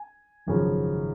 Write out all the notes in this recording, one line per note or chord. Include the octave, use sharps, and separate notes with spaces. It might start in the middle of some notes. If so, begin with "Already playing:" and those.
Already playing: G#5
G#1 F#2 C#3 F3